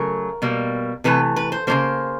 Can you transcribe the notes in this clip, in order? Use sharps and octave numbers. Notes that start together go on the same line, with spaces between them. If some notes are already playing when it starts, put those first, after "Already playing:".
Already playing: C#3 F#3 A3 A#4
B2 G3 A#3
C3 E3 A3 B4
B4
C5
C#3 F#3 A#3 C5